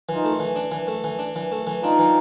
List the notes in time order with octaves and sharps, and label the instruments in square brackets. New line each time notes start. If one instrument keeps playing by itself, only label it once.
[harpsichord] E3 [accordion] D#4 F4
[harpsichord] A3
E3
D4
E3
A3
E3
D4
E3
A3
E3
[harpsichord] D4 [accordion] D#4 F4
[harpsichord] E3